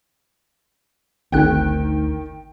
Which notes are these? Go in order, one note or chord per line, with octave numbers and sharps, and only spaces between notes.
G#1 D2 D#3 G5 F#6